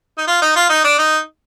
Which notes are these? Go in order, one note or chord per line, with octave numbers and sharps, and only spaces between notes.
D#4
F4
D#4
F4
D#4
D4
D#4